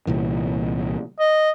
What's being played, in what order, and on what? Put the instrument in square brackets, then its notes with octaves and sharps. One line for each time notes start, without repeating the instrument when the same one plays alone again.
[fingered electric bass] C2 A#2 E3
[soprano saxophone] D#5